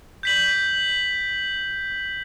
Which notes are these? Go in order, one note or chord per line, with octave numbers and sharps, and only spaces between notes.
G6 B6 F#7